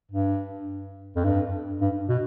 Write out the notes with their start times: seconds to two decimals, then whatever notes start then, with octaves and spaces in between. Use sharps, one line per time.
0.12 G2
1.16 F2
1.24 G2
1.81 G2
2.09 B2